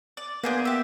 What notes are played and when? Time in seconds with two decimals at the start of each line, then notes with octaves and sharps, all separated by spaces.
0.17 D5
0.44 A#3 B3 D4 G#4 C5
0.65 G4 E5